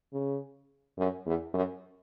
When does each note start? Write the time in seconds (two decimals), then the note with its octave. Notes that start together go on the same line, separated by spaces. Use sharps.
0.13 C#3
0.98 F#2
1.26 E2
1.54 F#2